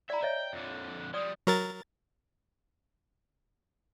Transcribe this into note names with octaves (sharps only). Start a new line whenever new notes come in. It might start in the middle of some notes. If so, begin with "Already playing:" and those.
D5 E5 A#5 B5
C#5 D#5 E5 G5
F2 D3
F3 G3 D5 D#6
F#3 A#4 A6